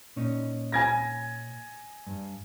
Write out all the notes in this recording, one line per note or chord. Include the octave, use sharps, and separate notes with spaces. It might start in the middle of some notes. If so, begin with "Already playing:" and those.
A#2 C#4 D#4
G#5 G#6 A#6
G2